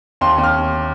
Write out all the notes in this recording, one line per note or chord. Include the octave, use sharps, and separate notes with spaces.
D#2 C6
D#2
F6